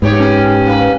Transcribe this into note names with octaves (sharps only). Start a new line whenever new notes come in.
G#2 B3 G4 C#5
C#4
A#3 B4